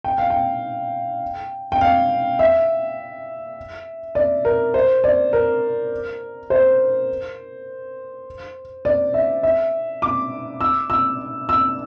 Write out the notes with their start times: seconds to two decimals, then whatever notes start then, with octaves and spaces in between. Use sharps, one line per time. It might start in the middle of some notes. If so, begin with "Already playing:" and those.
0.04 G5
0.18 F5
0.30 G5
1.72 G5
1.81 F5
2.39 E5
4.15 D5
4.45 A#4
4.74 C5
5.04 D5
5.33 A#4
6.50 C5
8.85 D5
9.14 E5
9.43 E5
10.02 D6
10.61 E6
10.90 E6
11.49 E6